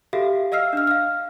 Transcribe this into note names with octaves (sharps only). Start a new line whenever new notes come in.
F#4 G4 A4 E5 F5
D#5 F5 E6 F6 C7
D4 F6
F5 F6